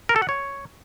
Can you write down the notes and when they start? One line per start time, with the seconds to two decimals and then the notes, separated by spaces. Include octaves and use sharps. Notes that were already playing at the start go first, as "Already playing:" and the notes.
0.09 A#4
0.16 A4
0.22 F#5
0.29 C#5